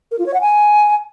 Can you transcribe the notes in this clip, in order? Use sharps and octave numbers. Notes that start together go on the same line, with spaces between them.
A#4
F4
C#5
F#5
G#5